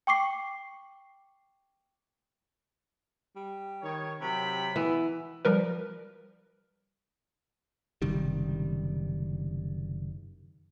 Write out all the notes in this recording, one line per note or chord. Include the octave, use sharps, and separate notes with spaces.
G5 C#6 D6 C7
G3
D#3 C#5
C3 F#3 G5 B5
E3 B3
F3 G3 A#4 B4
F#1 C3 D#3 G3